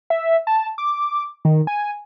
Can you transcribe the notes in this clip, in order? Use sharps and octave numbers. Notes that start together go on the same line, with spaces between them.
E5
A5
D6
D#3
G#5